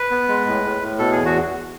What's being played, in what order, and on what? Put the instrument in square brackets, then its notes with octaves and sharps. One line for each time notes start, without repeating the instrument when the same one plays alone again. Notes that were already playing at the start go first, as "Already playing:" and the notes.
Already playing: [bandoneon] B4
B3
G#3
A2
A2
A2
B2 A4
E2 G#4
F#4